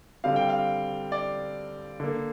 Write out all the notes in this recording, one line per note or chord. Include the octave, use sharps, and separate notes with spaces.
D3 G3 C4 F5
G5
F5
D5
D3 A#3